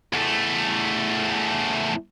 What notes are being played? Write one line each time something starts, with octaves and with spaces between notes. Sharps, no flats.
E2 A3